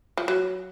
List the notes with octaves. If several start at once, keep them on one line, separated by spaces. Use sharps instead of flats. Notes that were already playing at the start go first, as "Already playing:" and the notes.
F3
F#3